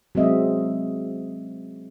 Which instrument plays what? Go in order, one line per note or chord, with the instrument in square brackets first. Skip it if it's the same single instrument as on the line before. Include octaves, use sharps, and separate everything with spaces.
[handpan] F#3 G#3 C4 D#5 E5